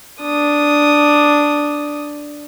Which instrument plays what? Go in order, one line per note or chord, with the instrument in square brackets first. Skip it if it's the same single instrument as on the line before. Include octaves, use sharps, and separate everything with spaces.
[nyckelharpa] D4 D#6